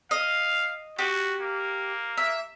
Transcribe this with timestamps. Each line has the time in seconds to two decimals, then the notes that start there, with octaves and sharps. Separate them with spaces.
0.11 D#5 F5
0.99 F#4 G4
1.41 A#3
2.17 E5